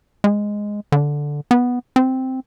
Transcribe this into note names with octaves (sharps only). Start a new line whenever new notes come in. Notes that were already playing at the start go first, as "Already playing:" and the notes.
G#3
D3
B3
C4